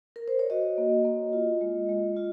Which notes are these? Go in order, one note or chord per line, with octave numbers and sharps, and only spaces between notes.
A#4
C5
C#5
F#4 D#5
A#3
A#3
F4
G#3
G#3
F4